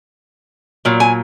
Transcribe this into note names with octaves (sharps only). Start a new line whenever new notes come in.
A#2 F#3
G#5